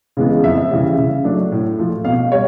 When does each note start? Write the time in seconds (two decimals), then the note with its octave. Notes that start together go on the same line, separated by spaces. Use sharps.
0.17 C#3 E3 G#3 B3
0.44 F2 E5
0.71 C#3 E3 G3
0.98 C#3
1.24 F#3 A3 D4
1.52 A2
1.79 F3 A3
2.05 B2 F5
2.32 G3 C#5